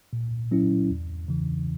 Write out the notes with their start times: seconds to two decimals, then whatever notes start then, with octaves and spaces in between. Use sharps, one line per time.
0.13 A#2
0.51 F#3 C#4 E4
0.90 E2
1.28 C#3 E3